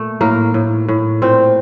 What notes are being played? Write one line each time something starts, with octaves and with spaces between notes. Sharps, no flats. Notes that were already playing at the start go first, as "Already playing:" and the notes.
Already playing: A#2 A3
A2 A#3
A2
A2
A#2 C4